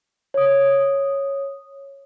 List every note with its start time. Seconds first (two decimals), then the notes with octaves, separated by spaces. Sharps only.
0.34 C#5 D#6